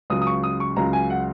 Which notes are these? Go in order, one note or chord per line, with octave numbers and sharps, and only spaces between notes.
C#2 C#3 F#3 D#6
D#6
C#6
D#6
C#6
C#2 C#3 F#3 A#5
G#5
F#5